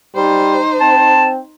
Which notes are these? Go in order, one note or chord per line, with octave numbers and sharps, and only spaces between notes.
G3 D#4 C5
C4 A5